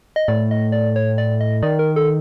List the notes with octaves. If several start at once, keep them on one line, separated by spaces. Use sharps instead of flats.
D#5
A2 D5
D#5
D5
C#5
D5
D#5
D#3 D5
A#4
A4